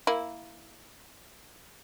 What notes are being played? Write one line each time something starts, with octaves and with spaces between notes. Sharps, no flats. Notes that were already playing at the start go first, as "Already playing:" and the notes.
A#3 E4